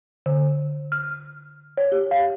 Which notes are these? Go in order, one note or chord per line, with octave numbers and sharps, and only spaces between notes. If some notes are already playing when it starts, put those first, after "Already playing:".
D3
F6
C#5
G4
F5